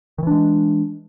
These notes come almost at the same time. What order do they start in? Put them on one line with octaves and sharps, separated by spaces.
D#3 E3 D4 G#3